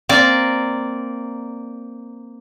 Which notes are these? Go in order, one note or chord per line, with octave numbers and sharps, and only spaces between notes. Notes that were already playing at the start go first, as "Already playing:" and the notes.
A#3 C4 D5